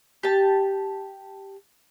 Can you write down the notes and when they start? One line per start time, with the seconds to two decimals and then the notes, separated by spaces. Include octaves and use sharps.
0.23 G4 A5